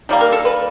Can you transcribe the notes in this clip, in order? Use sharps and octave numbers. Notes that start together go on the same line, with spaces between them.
D#3 G3 A#3
A#4
A4
B4